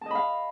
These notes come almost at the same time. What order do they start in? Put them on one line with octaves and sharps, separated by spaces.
A5 D#5 B5 F5